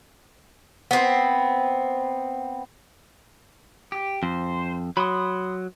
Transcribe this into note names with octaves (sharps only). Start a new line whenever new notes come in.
B3 C4
G4
F2 C5
F#3 B5 C6 D#6